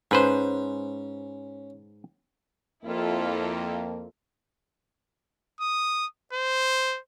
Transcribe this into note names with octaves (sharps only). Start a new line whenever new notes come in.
G#2 C#4 B4 C5
F2 A#3 E4 F4 A4
D#6
C5